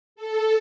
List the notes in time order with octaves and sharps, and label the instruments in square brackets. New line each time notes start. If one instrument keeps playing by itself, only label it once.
[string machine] A4